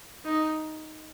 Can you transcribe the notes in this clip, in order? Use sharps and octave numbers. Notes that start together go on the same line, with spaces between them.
D#4